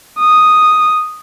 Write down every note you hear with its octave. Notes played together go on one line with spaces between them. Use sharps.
D#6